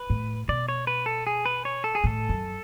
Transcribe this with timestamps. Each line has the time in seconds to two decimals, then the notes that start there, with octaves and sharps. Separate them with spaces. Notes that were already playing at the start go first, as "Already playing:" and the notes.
Already playing: B4
0.10 A2
0.48 B2 D5
0.69 C#5
0.87 B4
1.06 A4
1.27 G#4
1.46 B4
1.65 C#5
1.84 A4
1.95 G#4
2.04 A2 A4
2.29 F#2